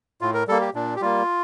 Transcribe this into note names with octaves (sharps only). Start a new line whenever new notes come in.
A2 F4
A#4
G3 A#3 A4
G4
A#2 D4
G4
G3 A#3 F4